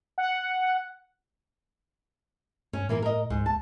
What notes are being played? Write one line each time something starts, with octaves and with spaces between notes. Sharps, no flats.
F#5
G2 C#4
A2 E3 A#3 A#4
A#4 D#5
C#2 G#2
A5